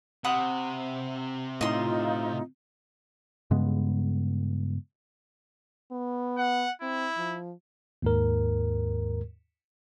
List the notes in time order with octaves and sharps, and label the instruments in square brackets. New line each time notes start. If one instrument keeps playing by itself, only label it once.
[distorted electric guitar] C3 [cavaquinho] F#5 B5 D#6
[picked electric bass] A2 [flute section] D#4 F4 [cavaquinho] D#5 C6
[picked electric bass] G2 C#3 G#3 B3
[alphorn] B3
[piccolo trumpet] F#5
[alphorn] C4 [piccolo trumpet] E4
[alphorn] F3
[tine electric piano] D#2 G#2 A#4